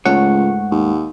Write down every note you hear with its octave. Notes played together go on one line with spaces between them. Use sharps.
C#2 G#2 A3 C#5 F#5
D#2